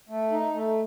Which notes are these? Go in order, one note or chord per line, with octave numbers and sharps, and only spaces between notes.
A3
D#4
A3